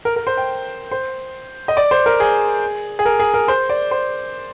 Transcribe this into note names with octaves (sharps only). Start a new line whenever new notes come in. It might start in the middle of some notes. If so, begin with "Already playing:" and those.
A#4
A#4
C5
G5
C5
D#5
D5
C5
A#4
G#4
G#4
A#4
G#4
A#4
C5
D5
C5